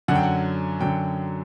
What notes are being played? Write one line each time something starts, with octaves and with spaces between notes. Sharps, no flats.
F#2 D3 F#3 F#5
G5
F#5
F#2 D3 F#3 G5